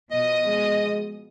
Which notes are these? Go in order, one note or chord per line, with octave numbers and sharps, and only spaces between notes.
B2 F3 D#5 D#6
G#3